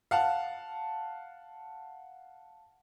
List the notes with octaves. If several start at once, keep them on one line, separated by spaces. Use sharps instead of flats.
F5 F#5 A5